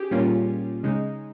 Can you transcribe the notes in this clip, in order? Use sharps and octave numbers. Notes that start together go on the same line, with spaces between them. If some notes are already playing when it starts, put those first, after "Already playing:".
Already playing: C#4 G4 G#4
A#2 G3 A#3 C#4 F4
C#3 G#3 D#4